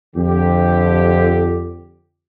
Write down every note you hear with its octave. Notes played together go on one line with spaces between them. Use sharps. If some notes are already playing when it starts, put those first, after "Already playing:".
F2 D3 G4